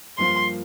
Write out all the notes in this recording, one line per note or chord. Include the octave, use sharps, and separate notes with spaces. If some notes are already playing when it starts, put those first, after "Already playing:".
G2 F3 A#3 F4 C5 C6